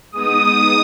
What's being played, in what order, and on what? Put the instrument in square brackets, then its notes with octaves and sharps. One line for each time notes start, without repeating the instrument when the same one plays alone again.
[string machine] G#3 B3 D#4 [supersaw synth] D#6